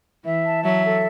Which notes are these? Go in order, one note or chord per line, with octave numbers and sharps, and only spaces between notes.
E3 E5
A5
F#3 E5
A4